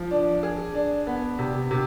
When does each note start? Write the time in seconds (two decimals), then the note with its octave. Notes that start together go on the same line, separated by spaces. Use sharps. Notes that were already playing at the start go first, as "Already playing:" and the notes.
Already playing: F3
0.11 D4
0.43 G#4
0.75 D4
1.07 B3
1.39 C3
1.71 C3